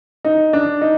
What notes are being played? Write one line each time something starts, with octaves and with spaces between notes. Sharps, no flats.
D#4
D4
D#4